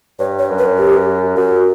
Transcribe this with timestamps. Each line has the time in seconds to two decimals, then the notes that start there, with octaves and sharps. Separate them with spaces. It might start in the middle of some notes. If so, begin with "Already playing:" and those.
0.19 G2 C#5
0.39 C#5
0.49 F#2
0.59 B4
0.78 G4
1.37 F#2 F#4